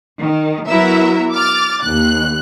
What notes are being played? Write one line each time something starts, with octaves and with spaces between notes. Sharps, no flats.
D#3
F#3 B3 E4 F#4 A#4 E5
D6 F6 A6
D#2 F#6